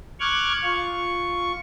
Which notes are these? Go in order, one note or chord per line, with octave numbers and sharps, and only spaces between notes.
C#6 D6 F6 F#6 G#6
F4 C#6